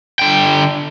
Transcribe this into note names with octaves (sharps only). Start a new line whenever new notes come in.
D3 G5